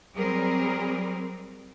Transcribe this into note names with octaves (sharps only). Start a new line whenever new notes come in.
F#3 G3 C4 G#4 A#4